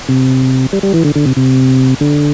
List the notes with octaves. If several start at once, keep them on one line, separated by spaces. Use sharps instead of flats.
C3
G3
G3
E3
D3
D3
C3
C3
D3